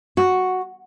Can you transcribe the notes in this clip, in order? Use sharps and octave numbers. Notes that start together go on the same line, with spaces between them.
F#4